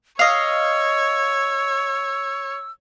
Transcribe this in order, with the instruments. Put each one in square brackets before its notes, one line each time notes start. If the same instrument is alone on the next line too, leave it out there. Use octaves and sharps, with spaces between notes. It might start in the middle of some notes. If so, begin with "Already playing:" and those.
[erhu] C#5 [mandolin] D#5 F5 [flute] E6